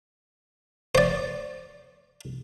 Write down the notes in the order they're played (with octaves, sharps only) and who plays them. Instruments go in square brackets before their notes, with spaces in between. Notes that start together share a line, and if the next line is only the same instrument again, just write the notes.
[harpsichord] C5 D5